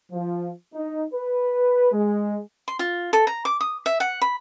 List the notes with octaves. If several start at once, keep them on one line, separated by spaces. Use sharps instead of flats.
F3
D#4
B4
G#3
C6
F4
A4
A#5
D6
D#6
E5
F#5
B5